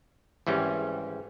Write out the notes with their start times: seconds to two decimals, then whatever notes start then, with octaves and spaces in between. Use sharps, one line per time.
0.47 G#1 E3 G3 C#4